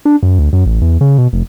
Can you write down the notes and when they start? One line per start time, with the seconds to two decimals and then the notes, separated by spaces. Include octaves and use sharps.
0.05 D4
0.23 F#2
0.39 D2
0.53 F#2
0.66 A1
0.82 E2
1.01 C#3
1.18 B2
1.33 F1